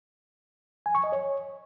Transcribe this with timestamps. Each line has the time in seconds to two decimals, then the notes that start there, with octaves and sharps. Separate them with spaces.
0.86 G#5
0.95 C#6
1.04 D#5
1.12 C#5